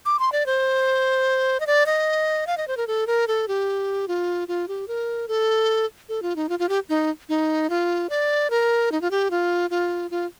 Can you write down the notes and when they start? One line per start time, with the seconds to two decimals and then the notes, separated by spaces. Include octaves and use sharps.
0.05 D6
0.19 C6
0.32 D5
0.46 C5
1.60 D#5
1.67 D5
1.86 D#5
2.47 F5
2.58 D#5
2.68 C5
2.77 A#4
2.87 A4
3.07 A#4
3.28 A4
3.48 G4
4.08 F4
4.48 F4
4.68 G4
4.88 A#4
5.28 A4
6.09 A4
6.22 F4
6.36 D#4
6.49 F4
6.59 F4
6.69 G4
6.89 D#4
7.29 D#4
7.70 F4
8.10 D5
8.50 A#4
8.92 D#4
9.01 F4
9.11 G4
9.31 F4
9.70 F4
10.11 F4